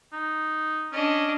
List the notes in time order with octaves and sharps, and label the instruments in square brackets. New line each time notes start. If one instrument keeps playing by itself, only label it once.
[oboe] D#4
[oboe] C#4 [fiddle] D4 D#5